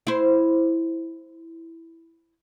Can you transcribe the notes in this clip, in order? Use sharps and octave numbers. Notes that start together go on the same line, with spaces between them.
E4 C5